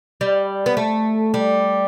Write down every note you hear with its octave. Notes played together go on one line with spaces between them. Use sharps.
G3
B3
A3
G3